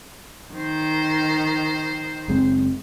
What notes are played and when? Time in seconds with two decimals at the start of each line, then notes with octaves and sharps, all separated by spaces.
0.53 D#3 C5
2.28 F#1 G#3 C4